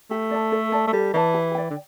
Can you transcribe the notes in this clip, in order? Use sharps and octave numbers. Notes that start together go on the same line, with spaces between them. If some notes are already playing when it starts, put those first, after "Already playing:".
A3 G4
D5 A5
A4
D5 A5
A3
G3 A4
E3 D5 A5
G4
D5 G5
D3